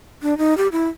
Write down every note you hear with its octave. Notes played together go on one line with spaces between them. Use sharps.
D4
D#4
G4
E4